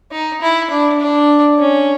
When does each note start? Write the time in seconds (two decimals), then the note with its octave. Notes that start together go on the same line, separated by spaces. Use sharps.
0.12 D#4
0.41 E4
0.70 D4
1.00 D4
1.58 C#4